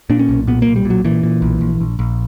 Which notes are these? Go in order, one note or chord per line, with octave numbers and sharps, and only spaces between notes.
A#2 D4
C#4
B1
A#2 B3
A#3
B1
G3
A#2
F#3
A#2 E3
A#2
B1
A#1
A#1
A#1